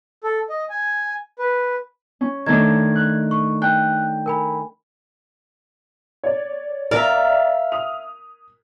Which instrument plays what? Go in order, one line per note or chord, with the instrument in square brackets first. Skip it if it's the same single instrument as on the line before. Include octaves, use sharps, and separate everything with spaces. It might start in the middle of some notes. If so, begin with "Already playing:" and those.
[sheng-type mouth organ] A4
D#5
G#5
B4
[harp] C#4
[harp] D#3 A3 D4 [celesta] G#6
[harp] F#6
[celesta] C#6
[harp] G5 [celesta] F#6
[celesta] A#4 G#5 B5
[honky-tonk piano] C#5 D5
[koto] A#4 [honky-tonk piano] D5 A#5 [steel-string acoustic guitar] E5 F5
[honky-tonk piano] D#6 F7